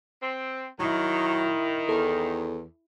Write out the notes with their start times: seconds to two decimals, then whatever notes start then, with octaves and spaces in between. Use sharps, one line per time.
0.21 C4
0.80 D#3 F#3 E4
1.89 E2 A4